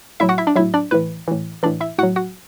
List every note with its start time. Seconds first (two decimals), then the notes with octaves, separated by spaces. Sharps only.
0.20 A2 F#3 E4 E5
0.29 F#4 F#5
0.38 E4 E5
0.47 D4 D5
0.56 A2 F#3 E4 E5
0.74 D4 D5
0.91 A2 E3 B4
1.28 A2 E3
1.63 A2 E3 D4 D5
1.80 E4 E5
1.98 A2 F#4 F#5
2.03 F#3
2.16 F#4 F#5